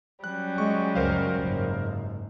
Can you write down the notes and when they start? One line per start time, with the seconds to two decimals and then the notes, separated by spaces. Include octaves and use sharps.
0.24 F#3 G3 C#4 F#6
0.58 G#3 C#6
0.95 C#2 F#2 A#4 C5 F5
1.39 F#1 G#2